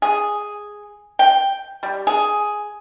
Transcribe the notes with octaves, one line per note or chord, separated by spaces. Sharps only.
G#4
G5
G3
G#4